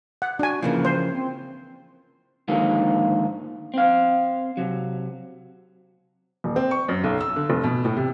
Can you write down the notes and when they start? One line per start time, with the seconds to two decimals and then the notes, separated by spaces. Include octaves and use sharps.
0.22 F#5
0.39 D4 F#4 G#5
0.62 C#3 E3 F3 A#3
0.85 C5
1.13 C4
2.48 G#2 D3 D#3 F3 A3 A#3
3.74 C4 F5
4.57 C3 F#3
6.44 D#1
6.56 C4
6.71 C#6
6.88 F#2
7.04 B1
7.21 E6
7.36 D3
7.50 F1
7.64 B2
7.85 A2
7.97 C3